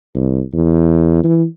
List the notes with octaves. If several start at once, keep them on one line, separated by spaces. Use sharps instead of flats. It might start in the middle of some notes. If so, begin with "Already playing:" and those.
C2
E2
E3